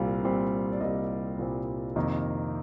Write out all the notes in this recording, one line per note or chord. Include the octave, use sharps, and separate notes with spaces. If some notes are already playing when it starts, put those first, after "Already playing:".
Already playing: C2 A#2 G3 C4 F5
C2 A#2 G3 C4
D5
C2 A#2 G3 C4 D#5
C2 A#2 G3 C4
F2 C3 D#3 A#3